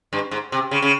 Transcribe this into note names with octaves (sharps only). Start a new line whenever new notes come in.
G2
G#2
C3
C#3
C#3